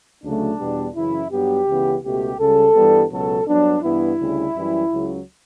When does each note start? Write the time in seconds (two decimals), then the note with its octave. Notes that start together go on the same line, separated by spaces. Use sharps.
0.23 D2 C#3 F#3 A3 D4
0.59 E2 B2 G3 B3
0.95 F#2 C#3 E3 E4
1.31 G2 F#3 B3 G4
1.68 C#2 C#3 E3 B3
2.03 C#2 B2 A3 G4
2.39 C#2 C#3 G3 A4
2.76 G2 E3 G3 B3
3.12 C#2 B2 F#3 A4
3.47 G2 F#3 B3 D4
3.83 G2 E3 B3 E4
4.19 D2 C#3 G3
4.56 F#2 E3 G3
4.92 C#2 C#3 F#3